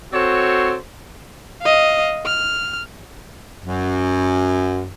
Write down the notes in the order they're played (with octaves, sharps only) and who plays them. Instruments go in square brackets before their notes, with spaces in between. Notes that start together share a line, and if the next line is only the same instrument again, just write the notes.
[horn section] C4 F#4 A4 C5 C#5
[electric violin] D#5 F5
F6
[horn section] F#2